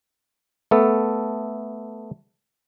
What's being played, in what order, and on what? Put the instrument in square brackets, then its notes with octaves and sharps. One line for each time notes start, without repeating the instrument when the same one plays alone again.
[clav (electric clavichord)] A3 B3 A4